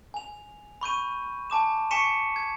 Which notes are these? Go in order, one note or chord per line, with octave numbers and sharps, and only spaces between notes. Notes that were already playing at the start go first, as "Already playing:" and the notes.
G#5 F7
B5 C#6 G6 D#7
G#5 A5 D6 E7
G#5 C#6 B6 C#7 D#7 E7
G#6